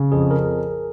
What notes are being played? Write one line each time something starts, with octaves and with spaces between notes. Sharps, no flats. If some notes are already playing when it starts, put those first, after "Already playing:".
Already playing: C#3
F2 G#4
A#4